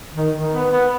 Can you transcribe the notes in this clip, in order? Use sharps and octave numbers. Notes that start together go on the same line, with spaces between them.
D#3
D#3
B3
B3